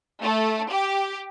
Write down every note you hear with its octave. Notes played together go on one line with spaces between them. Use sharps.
A3
G4